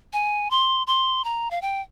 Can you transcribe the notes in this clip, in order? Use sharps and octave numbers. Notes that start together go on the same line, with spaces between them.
G#5
C6
C6
A#5
F5
G5